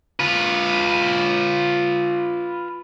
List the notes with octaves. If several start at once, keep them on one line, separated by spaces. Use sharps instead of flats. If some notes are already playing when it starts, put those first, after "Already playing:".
F4 B4